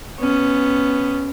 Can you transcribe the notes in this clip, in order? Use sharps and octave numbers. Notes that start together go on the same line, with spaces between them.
B3 C#4